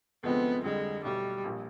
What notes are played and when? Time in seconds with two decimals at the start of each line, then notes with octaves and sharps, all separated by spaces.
0.23 D2 C3 F3 G#3 B3 C4
0.64 F2 D3 G3 G#3
1.05 B1 B2 F#3 G3 A3
1.44 A#1 A#2 F3